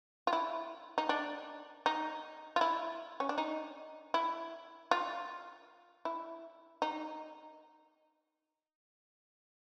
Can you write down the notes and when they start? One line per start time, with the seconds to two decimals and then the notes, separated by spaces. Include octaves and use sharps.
0.27 F4
0.33 E4
0.98 D#4
1.09 D4
1.86 D#4
2.56 F4
2.61 E4
3.20 C#4
3.29 D4
3.38 D#4
4.14 E4
4.91 F4
6.05 E4
6.82 D#4